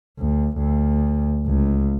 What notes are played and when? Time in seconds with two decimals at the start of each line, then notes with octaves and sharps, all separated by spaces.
0.19 D2
0.58 D2
1.46 C#2